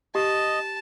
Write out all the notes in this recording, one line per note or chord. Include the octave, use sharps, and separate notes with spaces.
G4 D#5 A5